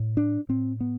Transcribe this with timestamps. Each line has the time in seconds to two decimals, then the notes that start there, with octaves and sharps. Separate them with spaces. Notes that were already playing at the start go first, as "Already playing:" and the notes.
Already playing: A2
0.17 D4
0.49 A2 C4
0.80 B3